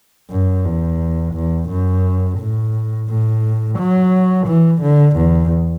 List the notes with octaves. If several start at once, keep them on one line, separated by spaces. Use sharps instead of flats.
F#2
E2
E2
F#2
A2
A2
F#3
E3
D3
E2